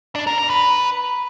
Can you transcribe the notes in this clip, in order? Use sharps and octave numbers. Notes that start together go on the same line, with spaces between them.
D4
A#4
A#4
B4